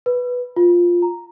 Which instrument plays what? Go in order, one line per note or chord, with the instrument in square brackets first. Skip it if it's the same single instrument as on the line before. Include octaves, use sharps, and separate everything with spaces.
[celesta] B4
F4
A#5